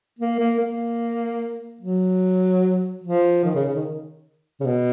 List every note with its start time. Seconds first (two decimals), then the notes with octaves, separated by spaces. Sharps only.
0.19 A#3
0.39 A#3
0.59 A#3
1.81 F#3
3.04 F3
3.44 D#3
3.55 C#3
3.65 C#3
3.75 D#3
4.60 C#3
4.66 B2